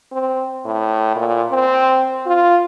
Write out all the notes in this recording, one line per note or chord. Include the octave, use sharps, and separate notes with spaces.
C4
A2
A#2
C4
F4